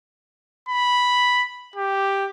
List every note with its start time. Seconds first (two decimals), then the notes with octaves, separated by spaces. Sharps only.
0.69 B5
1.76 G4